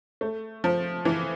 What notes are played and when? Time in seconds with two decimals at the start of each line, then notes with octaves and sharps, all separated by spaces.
0.21 A3
0.64 F3
1.05 E3